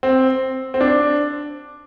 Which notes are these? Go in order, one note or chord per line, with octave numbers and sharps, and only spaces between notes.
C4
C4
D4